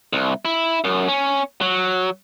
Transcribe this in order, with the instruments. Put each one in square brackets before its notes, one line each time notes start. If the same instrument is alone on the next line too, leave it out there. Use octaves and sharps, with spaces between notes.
[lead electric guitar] C2
E4
F#2
C#4
F#3